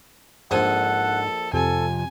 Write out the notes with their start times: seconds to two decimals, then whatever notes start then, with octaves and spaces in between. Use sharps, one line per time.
0.51 A#1 G#2 D4 A4 C5 F#5 G#5
1.53 F2 C3 F3 A4 G#5